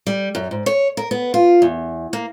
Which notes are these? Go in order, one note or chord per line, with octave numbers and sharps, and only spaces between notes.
G3
F#2
G#2
C#5
A#4
B3
F4
E2
A#3